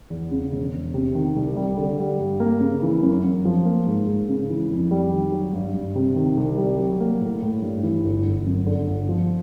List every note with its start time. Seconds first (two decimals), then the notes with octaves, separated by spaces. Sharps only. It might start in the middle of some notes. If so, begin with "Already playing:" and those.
0.10 E2
0.31 C#3
0.52 E1
0.74 E1
0.94 C3
1.15 D#3
1.36 C2
1.56 G3
1.77 D3
1.99 G3
2.19 G2
2.40 A#3
2.61 C#3
2.83 E3
3.03 F#2
3.24 F#2
3.45 F3
3.65 A#3
3.86 G#2
4.07 G#2
4.29 C#3
4.50 E3
4.70 F2
4.91 G3
5.12 D#3
5.32 F#3
5.53 G2
5.74 G2
5.95 C3
6.16 D#3
6.37 C2
6.58 G3
6.78 F#3
7.00 A#3
7.21 A2
7.42 A2
7.62 G2
7.83 E3
8.04 G1
8.26 G1
8.46 F#2
8.66 D3
8.88 G1
9.09 F3